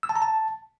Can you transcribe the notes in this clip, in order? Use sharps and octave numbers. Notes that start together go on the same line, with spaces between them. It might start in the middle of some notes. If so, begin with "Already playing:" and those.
E6
A5
A#5
A5